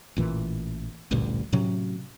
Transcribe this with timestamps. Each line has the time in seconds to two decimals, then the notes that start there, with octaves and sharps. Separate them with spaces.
0.16 A1 A#2 E3
1.11 A1 D2 G2 A#2
1.53 A2 C3 F#3 C#4